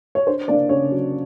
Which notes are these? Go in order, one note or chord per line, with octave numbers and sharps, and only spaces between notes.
C#5
D4 C5
A#3 D4 D5
C#3 C#5
F#3